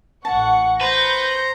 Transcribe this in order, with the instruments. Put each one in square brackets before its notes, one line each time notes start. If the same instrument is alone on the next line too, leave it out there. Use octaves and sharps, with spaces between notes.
[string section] A1 F#5 C#6 [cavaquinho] A5
[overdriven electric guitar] B4 [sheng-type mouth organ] C5 A#5 [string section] C#6 G6 A#6